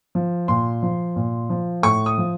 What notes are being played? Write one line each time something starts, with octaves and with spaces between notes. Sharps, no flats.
F3
A#2 C6
F3
A#2
F3
A2 C#6
D#6
F3